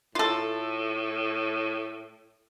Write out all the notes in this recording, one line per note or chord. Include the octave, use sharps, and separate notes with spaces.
A2 F4 A4